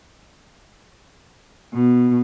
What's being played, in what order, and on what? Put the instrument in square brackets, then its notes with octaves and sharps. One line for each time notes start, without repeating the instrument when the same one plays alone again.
[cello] B2